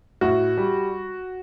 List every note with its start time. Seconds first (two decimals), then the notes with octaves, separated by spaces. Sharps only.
0.21 A2 F#4
0.58 G3